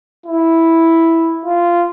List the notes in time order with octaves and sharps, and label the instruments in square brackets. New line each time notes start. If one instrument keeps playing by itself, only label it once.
[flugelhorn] E4
F4